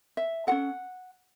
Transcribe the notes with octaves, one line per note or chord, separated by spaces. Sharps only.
E5
C#4 F#4 A4 F#5